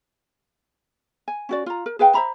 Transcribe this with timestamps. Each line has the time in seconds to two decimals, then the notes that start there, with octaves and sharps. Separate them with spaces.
1.28 G#5
1.49 C#4 F#4 D5
1.66 F4 A#5
1.86 A#4
1.99 G#4 B4 F5 G5
2.14 C5 E5 A#5 B5